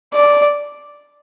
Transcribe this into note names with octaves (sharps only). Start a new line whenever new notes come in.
D5